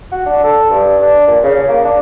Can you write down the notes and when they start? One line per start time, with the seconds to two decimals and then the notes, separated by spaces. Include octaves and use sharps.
0.12 F#4
0.26 D4
0.44 A4
0.70 G2
1.02 D4
1.27 A#2
1.43 C#3
1.69 A#3
1.84 D4